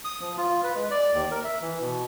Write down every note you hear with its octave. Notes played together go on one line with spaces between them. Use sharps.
D#6
F3
F4
B4
G#3
D5
D#2
A#4
E5
E3
B2